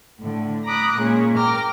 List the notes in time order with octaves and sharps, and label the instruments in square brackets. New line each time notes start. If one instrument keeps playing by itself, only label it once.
[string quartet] A2 D3
A#5 B5 D6 D#6 F#6
A#2 G#3 C#4 G#4
A#4 G5 A#5 D6 F6